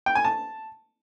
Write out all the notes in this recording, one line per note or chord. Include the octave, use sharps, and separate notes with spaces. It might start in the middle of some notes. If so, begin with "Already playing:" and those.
G5
G#5
A5